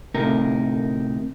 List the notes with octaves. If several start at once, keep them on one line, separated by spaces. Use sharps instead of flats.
D2 A2 C3 D#4 A#4